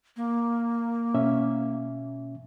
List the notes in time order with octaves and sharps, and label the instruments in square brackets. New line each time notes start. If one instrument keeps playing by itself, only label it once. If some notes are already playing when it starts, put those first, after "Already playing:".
[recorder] A#3
[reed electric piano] B2 C#4 E5